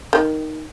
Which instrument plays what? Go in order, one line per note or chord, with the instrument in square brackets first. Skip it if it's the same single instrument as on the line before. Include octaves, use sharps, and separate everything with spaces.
[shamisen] D#3